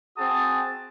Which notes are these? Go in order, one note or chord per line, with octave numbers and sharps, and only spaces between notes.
C4 F#4 G#4 A5 D#6